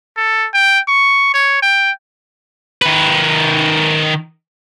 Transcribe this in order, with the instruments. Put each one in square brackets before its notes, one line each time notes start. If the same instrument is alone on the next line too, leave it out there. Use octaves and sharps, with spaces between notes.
[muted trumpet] A4
G5
C#6
C#5
G5
[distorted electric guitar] D#3 B4